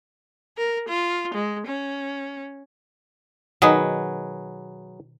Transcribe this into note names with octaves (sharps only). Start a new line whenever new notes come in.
A#4
F4
G#3
C#4
B2 D#3 F#3 G#4 B4 D#5